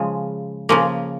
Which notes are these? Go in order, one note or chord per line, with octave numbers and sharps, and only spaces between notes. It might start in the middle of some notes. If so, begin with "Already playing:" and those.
Already playing: C#3 F3 G#3
C#3 F3 A#3